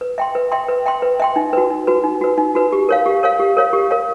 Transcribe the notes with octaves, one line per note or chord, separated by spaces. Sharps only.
B4
E5 G5 C6
B4
E5 G5 C6
B4
E5 G5 C6
B4
E5 G5 C6
D#4
F#4 B4
D#4
F#4 B4
D#4
F#4 B4
D#4
F#4 B4
G4
A#4 C#5 F5
G4
A#4 C#5 F5
G4
A#4 C#5 F5
G4
A#4 C#5 F5